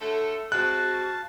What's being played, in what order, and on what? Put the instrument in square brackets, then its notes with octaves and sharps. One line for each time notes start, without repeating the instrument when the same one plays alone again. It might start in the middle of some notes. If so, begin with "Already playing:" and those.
[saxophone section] D3 F#3 A3 [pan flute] A4
[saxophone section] G#3 C4 [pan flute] F#4 [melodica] F5 A5 [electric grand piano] F#6